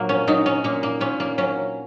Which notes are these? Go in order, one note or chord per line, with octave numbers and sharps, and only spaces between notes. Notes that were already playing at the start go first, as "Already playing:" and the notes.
Already playing: A#2 F#3 A#3
C#4
F#3 D#4
C#4
A#2 A#3
A#3
A#2 C#4
A#3
F#3 C#4